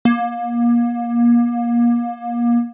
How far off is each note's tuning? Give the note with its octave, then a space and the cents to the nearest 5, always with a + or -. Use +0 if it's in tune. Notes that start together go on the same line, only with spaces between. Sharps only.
A#3 +30